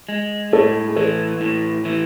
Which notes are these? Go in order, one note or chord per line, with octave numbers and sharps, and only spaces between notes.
G#3
A2 A4
G#4
E3 A4
A2
E3